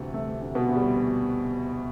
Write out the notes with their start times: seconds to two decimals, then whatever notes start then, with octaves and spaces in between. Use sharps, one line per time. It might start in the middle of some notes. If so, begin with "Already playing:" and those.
Already playing: D2 C3 E3 A3
0.13 D2 A3
0.41 D2
0.55 B2 B3
0.69 D2
0.76 G3